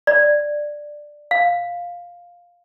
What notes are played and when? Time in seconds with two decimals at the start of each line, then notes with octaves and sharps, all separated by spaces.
0.07 D5
1.31 F5